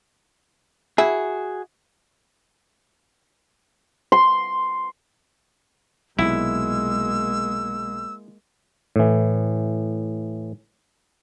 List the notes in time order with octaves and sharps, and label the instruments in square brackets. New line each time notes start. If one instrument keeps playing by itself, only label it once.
[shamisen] E4 [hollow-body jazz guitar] F#4 G#4
[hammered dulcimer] C6
[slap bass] B1 C3 [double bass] G#3 A#3 [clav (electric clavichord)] E4 [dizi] E6
[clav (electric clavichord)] A2 E3